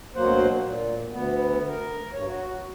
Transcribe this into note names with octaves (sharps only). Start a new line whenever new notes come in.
D2 B2 F#3 A#3 C5 F#5
A#2
D2 B3
A#4
G2 C#5
F#4